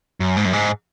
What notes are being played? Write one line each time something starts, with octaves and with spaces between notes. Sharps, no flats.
F#2
G#2
F#2
G#2